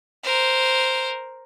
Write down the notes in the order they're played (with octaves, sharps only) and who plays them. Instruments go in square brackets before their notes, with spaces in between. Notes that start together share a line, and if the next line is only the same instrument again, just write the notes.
[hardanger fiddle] A#4 C5